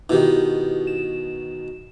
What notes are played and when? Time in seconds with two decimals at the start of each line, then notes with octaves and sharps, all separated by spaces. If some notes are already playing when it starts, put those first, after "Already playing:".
0.10 B2 D#3 E4 G4
0.87 E7